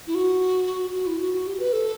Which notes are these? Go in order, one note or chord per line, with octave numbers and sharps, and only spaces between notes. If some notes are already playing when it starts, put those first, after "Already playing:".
E4
F#4
F#4
E4
F#4
F#4
G4
B4
A4